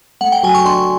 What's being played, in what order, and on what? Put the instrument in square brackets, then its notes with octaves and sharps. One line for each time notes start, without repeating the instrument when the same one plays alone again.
[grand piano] A3 [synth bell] F#5
[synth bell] G5
[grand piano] F#3 [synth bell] G#5
[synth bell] C#6
[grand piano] D4 [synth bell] C6